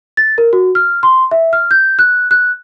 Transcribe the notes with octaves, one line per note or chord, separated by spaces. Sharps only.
A6
A#4
F#4
F6
C6
E5
F6
G6
F#6
F#6